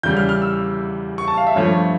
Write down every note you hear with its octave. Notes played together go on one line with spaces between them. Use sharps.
E2 C#3 G3 G6
F6
F6
E6
C#6
A5
F5
E5
G2 F3 A3 C#5